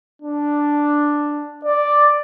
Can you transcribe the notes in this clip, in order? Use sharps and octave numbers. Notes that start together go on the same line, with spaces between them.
D4
D5